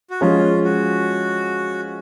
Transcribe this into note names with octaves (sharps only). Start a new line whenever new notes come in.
F#4
F3 G#3 C#4 F4 G#4
F#4